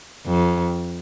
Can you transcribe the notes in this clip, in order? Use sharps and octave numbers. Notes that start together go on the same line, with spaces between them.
F2